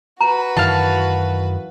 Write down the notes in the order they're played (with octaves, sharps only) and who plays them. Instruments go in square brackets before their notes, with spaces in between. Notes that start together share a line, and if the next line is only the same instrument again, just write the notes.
[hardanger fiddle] F#4 B4 [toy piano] A#5
[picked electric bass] F#2 D#3 E3 [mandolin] F5 A5